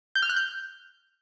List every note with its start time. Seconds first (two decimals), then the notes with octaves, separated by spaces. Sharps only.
0.15 G6
0.22 F6
0.29 F#6
0.36 G6